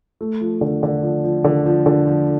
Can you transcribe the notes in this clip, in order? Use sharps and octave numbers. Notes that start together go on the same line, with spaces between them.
A3
F3
D3
D3
F3
F3
D3
F3
D3
F3